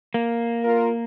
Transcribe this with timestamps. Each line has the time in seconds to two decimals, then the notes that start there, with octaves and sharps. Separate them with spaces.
0.14 A#3
0.64 F4 A#4